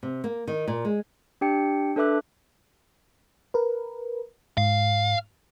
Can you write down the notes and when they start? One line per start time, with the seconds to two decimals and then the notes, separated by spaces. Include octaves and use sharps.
0.03 C3
0.24 A#3
0.47 D#3
0.68 A#2
0.85 G#3
1.41 D4 G4 G5 C#7
1.96 D4 A4 B4 E5 D6 F#6
3.54 A#4 B4
4.58 G#2 F5